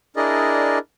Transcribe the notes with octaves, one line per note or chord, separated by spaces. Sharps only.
D4 E4 G#4 A#4 D5 D#5